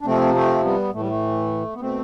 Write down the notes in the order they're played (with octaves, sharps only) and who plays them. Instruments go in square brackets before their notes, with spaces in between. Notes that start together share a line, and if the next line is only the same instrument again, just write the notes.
[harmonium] D4
C3 F3 A3 C4
A3 C4
G3 B3
A2 E3 A3
G3
A3
B3
B2 A3 C4